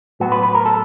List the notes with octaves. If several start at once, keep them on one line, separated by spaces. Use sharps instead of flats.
A2 F#3 B3 F#4
B4
B4
A#4
A4